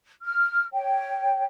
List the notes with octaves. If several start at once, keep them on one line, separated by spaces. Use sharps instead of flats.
F6
C#5 G5